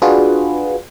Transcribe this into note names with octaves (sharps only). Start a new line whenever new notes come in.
D4 F4 F#4 G#4 B4